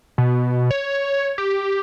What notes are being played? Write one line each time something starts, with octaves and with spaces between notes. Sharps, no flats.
B2
C#5
G4